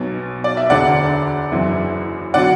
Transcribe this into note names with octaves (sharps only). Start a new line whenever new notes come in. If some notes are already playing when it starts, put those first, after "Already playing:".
Already playing: B1 B2 F#3
D5
E5
E1 D2 D3 D5 F#5
F#1 F#2 E3
D3 F#3 D5 F#5